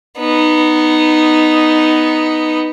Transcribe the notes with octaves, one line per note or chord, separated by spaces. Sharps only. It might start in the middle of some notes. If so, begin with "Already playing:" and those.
B3 D#4